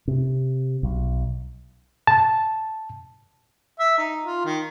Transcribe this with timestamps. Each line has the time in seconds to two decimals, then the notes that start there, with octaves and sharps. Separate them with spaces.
0.08 C3
0.83 B1
2.07 A5
3.79 E5
3.98 D#4
4.24 F4
4.45 D#3